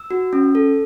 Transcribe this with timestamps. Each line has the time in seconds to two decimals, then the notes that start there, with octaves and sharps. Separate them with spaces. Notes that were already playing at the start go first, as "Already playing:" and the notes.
Already playing: E6
0.11 F#4
0.33 C#4
0.55 A4